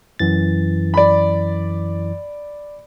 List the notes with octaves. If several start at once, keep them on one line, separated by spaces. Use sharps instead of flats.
F#2 E3 A6
D5 B5